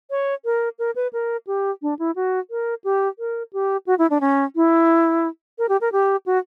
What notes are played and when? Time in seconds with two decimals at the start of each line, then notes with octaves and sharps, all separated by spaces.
0.10 C#5
0.45 A#4
0.79 A#4
0.96 B4
1.13 A#4
1.47 G4
1.82 D4
1.99 E4
2.16 F#4
2.51 A#4
2.84 G4
3.19 A#4
3.53 G4
3.87 F#4
3.99 E4
4.10 D4
4.21 C#4
4.56 E4
5.59 A#4
5.69 G4
5.81 A#4
5.92 G4
6.26 F#4